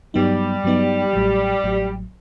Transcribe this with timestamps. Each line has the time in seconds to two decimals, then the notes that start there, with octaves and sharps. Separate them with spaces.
0.14 G2 F#3 G3 B3 D#4
0.64 G2 F#3 B3 D#4
1.13 A1 A2 F#3
1.64 A1 A2 F#3